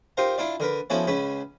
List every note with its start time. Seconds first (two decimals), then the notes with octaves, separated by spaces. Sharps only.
0.17 D#4 F4 G4 A#4 C5
0.38 D4 E4 F4 D5
0.60 D3 A#4 B4
0.90 F3 B3 C#4 E4 F#4 A4
1.07 C#2 C#3 C#4 B4 B5